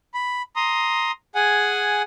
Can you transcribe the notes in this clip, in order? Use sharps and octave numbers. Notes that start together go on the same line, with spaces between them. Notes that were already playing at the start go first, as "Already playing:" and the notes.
B5
A#5 C6 D#6
G#4 F#5 G#5